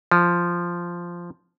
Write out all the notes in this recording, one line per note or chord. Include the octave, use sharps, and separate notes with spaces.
F3